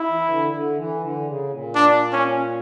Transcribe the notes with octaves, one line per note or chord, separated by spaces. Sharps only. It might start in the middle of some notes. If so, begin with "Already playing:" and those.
Already playing: E4
E3
D3
D3
E3
D3
C#3
A#2
D4
C#4